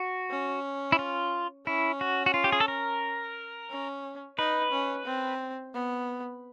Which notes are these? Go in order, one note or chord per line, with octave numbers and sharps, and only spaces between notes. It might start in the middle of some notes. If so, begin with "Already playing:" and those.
Already playing: F#4
C#4
E4
F4
C#4 E4
F#4
F#4
F4
G4
G#4
A4
A#4
C#4
D#4 B4
C#4
C4
B3